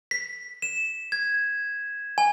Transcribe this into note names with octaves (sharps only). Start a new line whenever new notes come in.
B6
E7
G#6
G#5